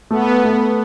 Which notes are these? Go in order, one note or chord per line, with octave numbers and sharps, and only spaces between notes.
A3 B3
A3